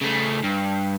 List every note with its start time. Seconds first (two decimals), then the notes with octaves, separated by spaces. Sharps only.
0.02 C#3 A3
0.43 G2